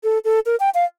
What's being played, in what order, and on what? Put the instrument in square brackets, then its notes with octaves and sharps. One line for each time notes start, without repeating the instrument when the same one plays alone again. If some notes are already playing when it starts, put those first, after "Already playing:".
[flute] A4
A4
A#4
G5
F5